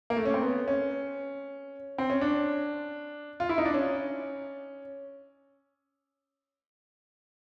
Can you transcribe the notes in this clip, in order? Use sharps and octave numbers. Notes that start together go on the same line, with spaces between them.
A#3
A3
C#4
C4
B3
C#4
C4
C#4
D4
F4
E4
D#4
D4
C#4